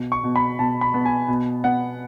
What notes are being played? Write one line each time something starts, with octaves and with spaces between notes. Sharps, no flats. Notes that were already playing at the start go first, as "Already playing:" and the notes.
Already playing: B2
C#6
B2
B5
B2 A5
B5
B3
G#5
B2
B3 F#5